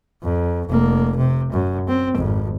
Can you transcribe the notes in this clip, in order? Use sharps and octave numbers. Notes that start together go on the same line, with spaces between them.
F2
F1 A#3
C3
F#2
C4
G#1 F2